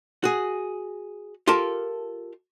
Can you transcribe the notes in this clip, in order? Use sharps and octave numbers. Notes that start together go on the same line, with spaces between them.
F#4 G#4
F4 G4 A4 A#4 A5